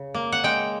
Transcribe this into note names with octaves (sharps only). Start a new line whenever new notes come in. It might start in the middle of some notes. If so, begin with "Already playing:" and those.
Already playing: C#3
A#3
F#5
G#3 G5